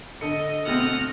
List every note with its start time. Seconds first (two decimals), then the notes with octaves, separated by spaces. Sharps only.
0.21 D3 A4 D#5 C#7
0.66 B2 A3 C4 D#5 F#5 F6